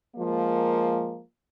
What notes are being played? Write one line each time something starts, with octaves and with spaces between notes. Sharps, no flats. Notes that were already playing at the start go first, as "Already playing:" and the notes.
F3 G#3 A#3